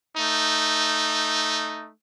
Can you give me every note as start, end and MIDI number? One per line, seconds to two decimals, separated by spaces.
0.17 1.90 57
0.17 1.90 63